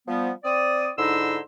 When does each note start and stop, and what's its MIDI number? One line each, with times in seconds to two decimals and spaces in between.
0.07 0.31 53
0.07 0.31 55
0.07 0.31 59
0.44 0.89 60
0.44 0.89 74
0.44 0.89 87
0.98 1.38 44
0.98 1.38 50
0.98 1.38 63
0.98 1.38 64
0.98 1.38 84
0.98 1.38 88